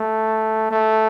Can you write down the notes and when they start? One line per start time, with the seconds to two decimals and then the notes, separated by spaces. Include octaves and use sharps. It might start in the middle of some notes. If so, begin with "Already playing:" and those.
Already playing: A3
0.71 A3